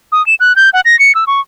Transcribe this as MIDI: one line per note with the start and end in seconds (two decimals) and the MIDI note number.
0.12 0.25 87
0.27 0.35 100
0.40 0.55 90
0.56 0.70 91
0.73 0.81 78
0.85 0.98 94
0.99 1.15 97
1.15 1.25 88
1.27 1.40 85